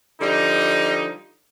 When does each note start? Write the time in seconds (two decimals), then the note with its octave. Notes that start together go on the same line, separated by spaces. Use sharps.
0.21 D3 F3 G3 D#4